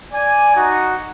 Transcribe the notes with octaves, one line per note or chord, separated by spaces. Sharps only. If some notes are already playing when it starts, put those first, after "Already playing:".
D5 G#5
D#4 F#4